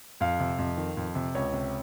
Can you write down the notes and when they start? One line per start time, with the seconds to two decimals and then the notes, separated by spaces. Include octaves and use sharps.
0.20 F2 F5
0.40 C3
0.59 F2
0.77 D#3
0.97 F2
1.15 C3
1.35 C#2 C#5
1.53 C3